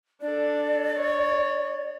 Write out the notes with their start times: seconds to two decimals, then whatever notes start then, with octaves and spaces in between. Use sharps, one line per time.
0.22 D4 A4 D5
0.98 C#5